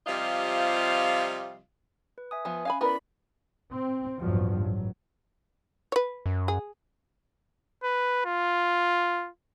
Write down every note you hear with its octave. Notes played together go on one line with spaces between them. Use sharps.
C3 F3 G3 F4 D#5 F5
B4
E5 G#5 D#6
F3 B3 G#5
C#4 F5 G#5 B5
B3 E4 A#4 B4 D5 B5
C4
A1 E2 G2 F3 F#3
A1 F#3
B4 C#5
F#2
G#4
B4
F4